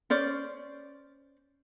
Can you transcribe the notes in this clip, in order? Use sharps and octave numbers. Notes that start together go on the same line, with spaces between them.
C#4 C5 D5